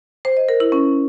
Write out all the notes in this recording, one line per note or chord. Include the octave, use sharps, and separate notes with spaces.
C5
D#5
A#4
E4
C#4